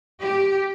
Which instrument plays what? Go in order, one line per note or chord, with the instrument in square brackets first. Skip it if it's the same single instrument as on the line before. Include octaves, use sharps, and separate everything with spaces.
[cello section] G4